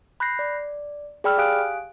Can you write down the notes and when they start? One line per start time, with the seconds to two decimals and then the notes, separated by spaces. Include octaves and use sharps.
0.20 B5 F#6 G6 A#6 C7
0.39 D5
1.24 G#4 D5 G5 B5 E6 F6
1.38 G4 F5 G#5 D#6 F#6 D7